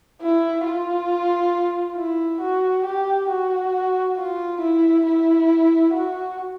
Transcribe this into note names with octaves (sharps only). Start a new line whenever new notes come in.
E4
F4
E4
F#4
G4
F#4
F4
E4
E4
F#4